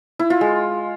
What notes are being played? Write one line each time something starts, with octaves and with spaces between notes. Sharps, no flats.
E4
F4
G#3